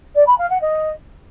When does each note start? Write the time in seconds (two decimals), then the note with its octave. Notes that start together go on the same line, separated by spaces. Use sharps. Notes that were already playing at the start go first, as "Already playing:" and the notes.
0.15 D5
0.27 B5
0.38 F5
0.50 F#5
0.61 D#5